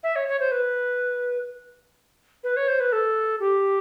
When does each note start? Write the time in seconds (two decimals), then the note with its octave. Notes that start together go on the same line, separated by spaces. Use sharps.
0.03 E5
0.15 C#5
0.28 C#5
0.39 C5
0.51 B4
2.43 B4
2.56 C#5
2.68 C5
2.80 B4
2.92 A4
3.39 G4